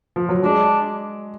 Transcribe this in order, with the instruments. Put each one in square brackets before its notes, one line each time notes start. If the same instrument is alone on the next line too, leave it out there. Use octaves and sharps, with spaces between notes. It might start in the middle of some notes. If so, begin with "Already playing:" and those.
[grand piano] F3
F#3
[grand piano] G#3 [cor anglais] D4